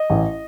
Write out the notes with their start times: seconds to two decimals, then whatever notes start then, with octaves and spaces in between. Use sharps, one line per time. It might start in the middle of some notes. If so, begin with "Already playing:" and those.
Already playing: D#5
0.10 A1